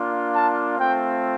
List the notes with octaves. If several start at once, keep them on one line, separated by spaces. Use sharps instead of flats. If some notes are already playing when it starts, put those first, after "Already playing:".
Already playing: A#3 D4 F4
A5
A3 C4 F4 G5